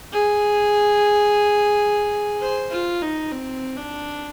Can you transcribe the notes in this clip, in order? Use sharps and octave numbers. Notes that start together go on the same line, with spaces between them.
G#4
C5
F4
D#4
C4
D4